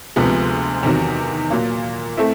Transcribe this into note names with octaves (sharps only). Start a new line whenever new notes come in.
D2 C3 F3 G#3 B3
E2 C3 D#3 F#3
A#2 F#3 A#3
A3 C4 E4